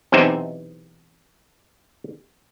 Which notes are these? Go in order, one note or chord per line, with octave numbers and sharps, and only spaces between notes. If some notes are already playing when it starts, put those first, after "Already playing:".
B1 E2 C3 C4 D#4 E5